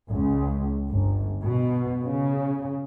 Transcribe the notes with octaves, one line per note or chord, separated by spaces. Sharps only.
C#2
G1
B2
C#3